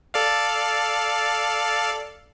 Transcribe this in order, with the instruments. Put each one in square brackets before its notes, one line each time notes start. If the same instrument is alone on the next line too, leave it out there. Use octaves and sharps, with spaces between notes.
[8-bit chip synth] A4 D5 F5